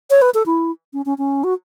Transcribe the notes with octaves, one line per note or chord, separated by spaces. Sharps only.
C#5
B4
A4
E4
C#4
C#4
C#4
F#4